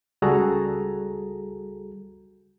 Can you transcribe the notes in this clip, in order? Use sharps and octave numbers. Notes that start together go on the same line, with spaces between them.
C#2 G3 F#4 G#4 A4 A#5